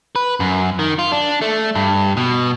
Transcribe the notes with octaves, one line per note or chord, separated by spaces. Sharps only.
B4
F#2
D#3
F4
D4
A3
G2
B2